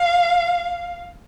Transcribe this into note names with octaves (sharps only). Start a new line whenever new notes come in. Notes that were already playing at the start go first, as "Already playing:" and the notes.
Already playing: F5